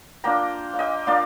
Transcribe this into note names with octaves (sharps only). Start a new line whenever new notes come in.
A#3 D4 F4 G5 A#5
F5
D#5 G5
A#3 D4 F4 D5 F5